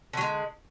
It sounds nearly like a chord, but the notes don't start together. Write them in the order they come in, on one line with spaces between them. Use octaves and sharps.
D3 F#3 G#3